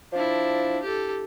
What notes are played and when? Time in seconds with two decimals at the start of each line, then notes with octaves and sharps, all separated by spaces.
0.12 F3 D4 E4
0.82 G4 A4